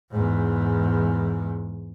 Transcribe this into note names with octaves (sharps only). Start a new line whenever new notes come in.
E2 G#2